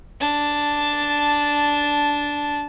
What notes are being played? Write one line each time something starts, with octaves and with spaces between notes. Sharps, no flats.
D4 A5